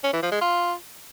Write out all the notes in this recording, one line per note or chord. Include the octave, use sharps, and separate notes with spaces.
C#4
E3
F3
G#3
F4